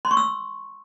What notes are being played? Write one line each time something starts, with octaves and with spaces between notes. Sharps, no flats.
C6
C#6
E6